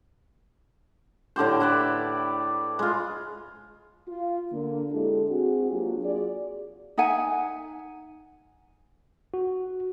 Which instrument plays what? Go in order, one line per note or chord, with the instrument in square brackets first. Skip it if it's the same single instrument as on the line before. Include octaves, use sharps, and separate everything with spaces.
[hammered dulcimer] A2 D3 G4 C5
E4 B4 D5
G#3 F4
[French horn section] F4
D3 A#3
G#3 D4 E4 G4 A4
C4 F#4 G#4
F#3 A#3 D4 F4 G4
F4 F#4 G#4 D5
[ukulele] D#4 E5 F#5 G#5
[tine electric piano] F#4